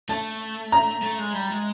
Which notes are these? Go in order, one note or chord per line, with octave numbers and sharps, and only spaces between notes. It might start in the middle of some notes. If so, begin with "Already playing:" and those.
A3 A5
A#5
A3
G#3
G3
G#3